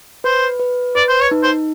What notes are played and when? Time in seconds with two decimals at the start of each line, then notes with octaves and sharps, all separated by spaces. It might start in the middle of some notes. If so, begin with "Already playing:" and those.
0.24 B4 C5
0.59 B4
0.95 B4 D5
1.09 C5
1.20 C#5
1.31 D#4
1.43 C5